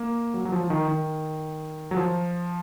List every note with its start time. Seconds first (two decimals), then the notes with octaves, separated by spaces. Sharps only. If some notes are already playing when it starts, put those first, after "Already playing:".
Already playing: A#3
0.34 F#3
0.45 F#3
0.52 F3
0.64 F3
0.70 D#3
0.88 D#3
1.91 F#3
1.97 F3